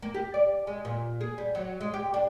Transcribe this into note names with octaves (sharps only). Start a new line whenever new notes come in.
A#3
G4
D5
G#3
A#2
G#4
G3
F#3
G#3
G4
D4